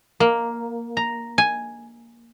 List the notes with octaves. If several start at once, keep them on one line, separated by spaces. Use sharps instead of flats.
A#3
A#5
G#5